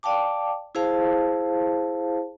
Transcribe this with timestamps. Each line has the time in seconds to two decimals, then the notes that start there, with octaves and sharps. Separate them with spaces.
0.03 D5 F5 G5 A5 D6
0.75 E4 G#4 C5 F5 A5